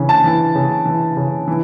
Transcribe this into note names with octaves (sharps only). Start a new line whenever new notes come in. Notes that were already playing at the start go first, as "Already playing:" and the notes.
Already playing: C#3 E3
A5
E3
C#3
E3
C#3
E3